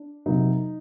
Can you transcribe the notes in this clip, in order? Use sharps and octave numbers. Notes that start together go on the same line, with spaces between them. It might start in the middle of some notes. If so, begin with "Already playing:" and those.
Already playing: D4
C3 F#3 A#3 D#4